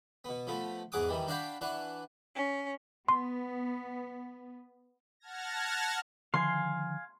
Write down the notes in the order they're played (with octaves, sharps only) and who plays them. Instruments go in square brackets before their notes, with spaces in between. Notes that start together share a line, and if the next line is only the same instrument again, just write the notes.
[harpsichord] B2 B3
F3 A3 B3
E2 G#2 G#4 F#5 D6 D#6
D#3 E3 G3
D4 F#4 D5 F5 G5 B5
E3 D4 F#5 C#6
[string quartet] C#4
[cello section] B3 [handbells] C6
[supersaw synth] F#5 A5 F6 G#6 A#6
[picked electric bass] D3 D#3 F3 [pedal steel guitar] F5 G#5 [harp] C6